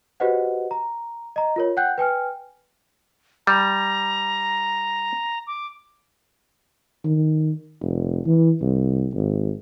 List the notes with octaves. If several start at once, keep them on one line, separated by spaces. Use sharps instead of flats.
F#4 G4 B4 C5 D#5 F#5
A#5
D#5 A#5
F4 A#4 C#5
F#5 G5 F#6 G6
B4 G5 G#5 F6
G3 A#5
D6
D#3
F1
E3
C2
G#1